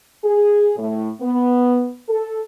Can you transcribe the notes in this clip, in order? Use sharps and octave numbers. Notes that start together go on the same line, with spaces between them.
G#4
A2
B3
A4